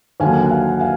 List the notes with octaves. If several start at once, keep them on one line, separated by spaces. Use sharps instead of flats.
D#2 D3 F#3 A#3 F5 G#5
F#5
F5 G#5
F#5
F5 G#5